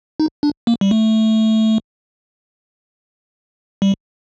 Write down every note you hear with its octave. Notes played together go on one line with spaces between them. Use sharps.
D#4
D4
A#3
G3
A3
G3